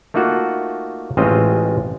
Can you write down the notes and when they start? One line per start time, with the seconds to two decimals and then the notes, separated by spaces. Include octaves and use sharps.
0.14 A3 A#3 D#4 F4 F#4
1.17 A1 G#3 C4 C#4 F4 D#5